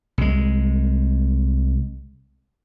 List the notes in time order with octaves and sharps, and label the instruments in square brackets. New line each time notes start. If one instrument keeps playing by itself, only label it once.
[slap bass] C2 G#3